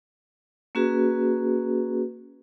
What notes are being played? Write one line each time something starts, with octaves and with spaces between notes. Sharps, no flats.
A#3 C#4 F#4 G#4 B4